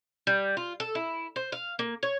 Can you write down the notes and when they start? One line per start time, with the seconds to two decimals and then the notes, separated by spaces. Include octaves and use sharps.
0.27 G3
0.57 F4
0.80 A4
0.95 E4
1.36 C5
1.52 F5
1.79 A#3
2.03 C#5